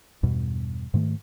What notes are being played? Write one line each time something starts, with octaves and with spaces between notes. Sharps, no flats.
E2 G2 B2
G#2 D#3 A3